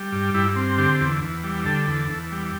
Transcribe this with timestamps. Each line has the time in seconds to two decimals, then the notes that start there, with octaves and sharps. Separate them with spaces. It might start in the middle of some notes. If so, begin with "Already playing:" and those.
Already playing: G3
0.12 G2
0.34 G2 E4
0.56 C4
0.78 D3 G4
1.00 E2
1.22 E2
1.44 G3
1.65 D3 A4
1.87 E2
2.09 E2
2.32 G3